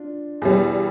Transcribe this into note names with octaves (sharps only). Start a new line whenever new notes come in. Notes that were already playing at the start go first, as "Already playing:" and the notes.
Already playing: D4 F4
E2 B2 G3 E4 G4